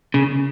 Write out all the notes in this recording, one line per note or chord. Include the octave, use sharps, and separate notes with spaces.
C#3